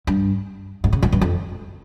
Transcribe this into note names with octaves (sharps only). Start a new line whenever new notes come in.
G2
G#2
C#3
G#2
G2
F2